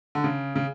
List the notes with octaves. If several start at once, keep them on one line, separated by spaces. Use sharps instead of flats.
D3
C#3
C#3